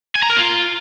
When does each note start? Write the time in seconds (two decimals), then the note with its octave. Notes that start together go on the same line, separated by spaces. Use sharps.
0.15 G#5
0.23 A#5
0.30 A#4
0.37 F4